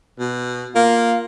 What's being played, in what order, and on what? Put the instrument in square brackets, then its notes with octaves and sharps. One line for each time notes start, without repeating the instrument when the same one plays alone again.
[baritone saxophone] B2
[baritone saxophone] A#3 [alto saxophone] F4